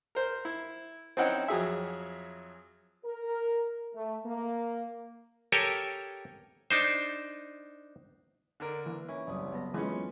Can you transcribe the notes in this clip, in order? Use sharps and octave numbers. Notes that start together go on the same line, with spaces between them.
A#4 C5
E4
C4 C#4 D#4 E4 F#5 G5
F2 F#3 G#4 E5
A#4
A3
A#3
G4 A4 A#4 C#5 G#5
D4 D#4 C5
D3 D4 A#4
E3 A#3
C#4 E4
F#1 C2 D#6
B3 A4 A#6
E3 G#3 C#4 F4 G#5 B5 B6